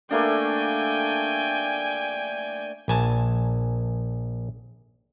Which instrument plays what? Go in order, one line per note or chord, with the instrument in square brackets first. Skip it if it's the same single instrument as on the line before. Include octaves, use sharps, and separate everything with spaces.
[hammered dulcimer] A3 A#3 D4 [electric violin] G5 G#5
[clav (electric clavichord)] A#1 G#5 A5